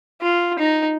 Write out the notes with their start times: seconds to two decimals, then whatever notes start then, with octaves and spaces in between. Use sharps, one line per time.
0.22 F4
0.59 D#4